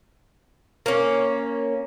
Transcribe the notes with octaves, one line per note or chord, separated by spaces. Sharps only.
A#3 C#4